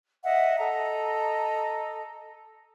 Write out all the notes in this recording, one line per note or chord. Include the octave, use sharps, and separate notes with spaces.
D#5 E5 F#5
A4 D#5 A#5